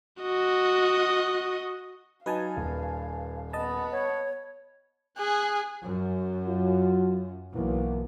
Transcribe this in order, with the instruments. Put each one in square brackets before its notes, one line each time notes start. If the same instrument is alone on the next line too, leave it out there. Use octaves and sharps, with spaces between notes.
[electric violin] F#4 D#5
[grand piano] F#3 D#4 [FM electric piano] B4 G#5 A5 [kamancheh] F5
[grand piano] D#1
[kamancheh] B3 B4 [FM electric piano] D#5 A5
[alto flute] C#5
[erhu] G#4 [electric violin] G#5 F#6
[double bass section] F#2
[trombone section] F#3 F4
[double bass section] B1 [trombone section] E3 A#3